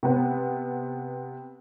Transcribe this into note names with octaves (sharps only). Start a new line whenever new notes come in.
C3 B3 C4